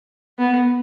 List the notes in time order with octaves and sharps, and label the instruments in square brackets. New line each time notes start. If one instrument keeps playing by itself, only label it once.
[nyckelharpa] B3